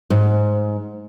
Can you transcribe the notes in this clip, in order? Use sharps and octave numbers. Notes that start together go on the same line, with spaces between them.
G#2